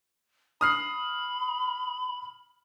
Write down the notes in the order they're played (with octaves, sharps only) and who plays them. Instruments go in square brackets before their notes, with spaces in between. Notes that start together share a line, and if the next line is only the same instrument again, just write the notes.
[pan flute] B5 [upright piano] D#6 F6 C7